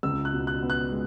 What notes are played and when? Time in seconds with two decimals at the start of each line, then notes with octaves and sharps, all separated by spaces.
0.03 C#2 E6
0.25 F#6
0.32 B2
0.47 F#6
0.62 B3
0.70 F#6
0.92 G#3